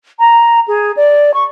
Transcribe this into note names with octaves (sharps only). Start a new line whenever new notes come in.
A#5
G#4
D5
C#6